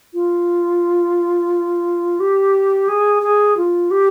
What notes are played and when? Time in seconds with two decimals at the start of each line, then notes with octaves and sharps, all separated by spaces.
0.14 F4
2.20 G4
2.88 G#4
3.23 G#4
3.57 F4
3.91 G4